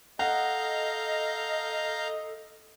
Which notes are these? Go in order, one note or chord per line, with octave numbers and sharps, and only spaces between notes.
A4 D#5 F5 F#5 A#5 G6